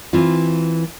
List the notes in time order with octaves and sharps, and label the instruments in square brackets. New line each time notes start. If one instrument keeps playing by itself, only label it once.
[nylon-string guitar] E3 C4 F4